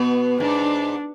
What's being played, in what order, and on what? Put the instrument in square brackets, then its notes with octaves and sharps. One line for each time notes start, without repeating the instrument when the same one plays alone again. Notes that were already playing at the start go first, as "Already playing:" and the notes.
Already playing: [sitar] B2 [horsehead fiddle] B3
[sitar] G#2 [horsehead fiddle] D4